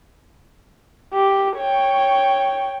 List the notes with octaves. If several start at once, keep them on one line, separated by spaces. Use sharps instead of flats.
G4
C#5 G5